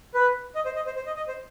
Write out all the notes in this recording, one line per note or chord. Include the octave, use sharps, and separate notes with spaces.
B4
D#5
C5
D#5
C5
C5
D#5
D#5
C5